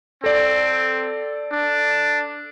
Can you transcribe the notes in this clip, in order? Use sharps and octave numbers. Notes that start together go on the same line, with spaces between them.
C4 A4 D5
D4